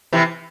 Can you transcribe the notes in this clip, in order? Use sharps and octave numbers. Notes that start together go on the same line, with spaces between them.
C3 E3